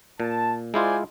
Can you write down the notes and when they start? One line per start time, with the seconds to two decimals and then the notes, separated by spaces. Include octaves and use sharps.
0.20 A#2 A5
0.74 G#3 E4 F4 C5 D5 G#5